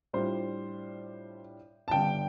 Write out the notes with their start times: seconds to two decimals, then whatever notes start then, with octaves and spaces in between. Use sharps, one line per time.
0.13 A2 G3 D4 F4 C5
1.88 A5
1.91 G1 G2 D3 G3 G5